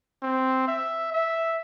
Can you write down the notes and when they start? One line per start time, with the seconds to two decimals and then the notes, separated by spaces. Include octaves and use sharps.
0.23 C4
0.68 E5
1.12 E5